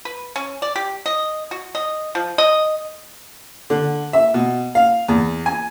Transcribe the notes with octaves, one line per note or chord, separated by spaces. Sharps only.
B4
C#4
D5
G4
D#5
F#4
D#5
F3
D#5
D3
E5
B2
F5
E2
G#5